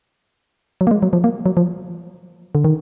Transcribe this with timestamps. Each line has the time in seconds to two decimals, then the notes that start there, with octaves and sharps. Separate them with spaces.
0.81 F#3
0.87 A#3
0.91 G#3
1.03 F#3
1.13 F3
1.24 A#3
1.46 F#3
1.57 F3
2.55 D3
2.65 D#3